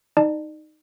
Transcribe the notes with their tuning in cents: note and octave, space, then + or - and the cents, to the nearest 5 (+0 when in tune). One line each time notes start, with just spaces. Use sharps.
D#4 +0 D5 +40 A5 +0